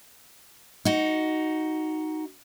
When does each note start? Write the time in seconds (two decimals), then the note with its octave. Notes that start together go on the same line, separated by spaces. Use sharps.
0.85 D#4 F#4